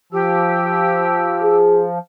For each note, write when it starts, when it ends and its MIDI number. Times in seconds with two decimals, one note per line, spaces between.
0.12 1.99 53
0.12 1.57 67
0.12 1.57 88
1.43 1.85 68